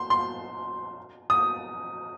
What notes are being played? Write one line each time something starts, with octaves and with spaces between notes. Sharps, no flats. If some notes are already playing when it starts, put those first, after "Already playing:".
Already playing: C6
C6
D#6